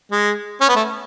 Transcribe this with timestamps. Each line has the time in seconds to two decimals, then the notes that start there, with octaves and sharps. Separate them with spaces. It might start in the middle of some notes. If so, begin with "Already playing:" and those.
0.12 G#3
0.61 C#4
0.69 B3
0.76 A3